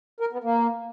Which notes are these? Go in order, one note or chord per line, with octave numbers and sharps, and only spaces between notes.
A#4
B3
A#3